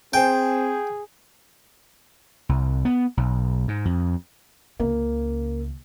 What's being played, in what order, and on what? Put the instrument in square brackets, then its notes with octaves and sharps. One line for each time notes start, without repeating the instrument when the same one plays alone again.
[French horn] C4 [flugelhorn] G#4 [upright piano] C5 G#5 [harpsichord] G5
[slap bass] C2
B3
B1
G#2
F2
[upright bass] C#2 C#3 [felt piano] A#3